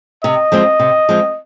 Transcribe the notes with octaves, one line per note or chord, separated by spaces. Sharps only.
C3 D#5
F3 G#3 C4
C3
F3 G#3 C4